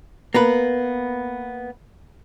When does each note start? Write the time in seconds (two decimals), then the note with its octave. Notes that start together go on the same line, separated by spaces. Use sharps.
0.34 A#3 B3 B4